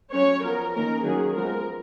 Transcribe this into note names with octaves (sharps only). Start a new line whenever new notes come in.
F#3 C#4 C#5
F3 B3 A#4
D#3 A#3 C#4 A#4
D#3 F#3 A#3 C#4 G#4
F3 G#3 B3 A#4